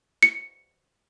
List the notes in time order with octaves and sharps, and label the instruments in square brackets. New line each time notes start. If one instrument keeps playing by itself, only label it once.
[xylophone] C#7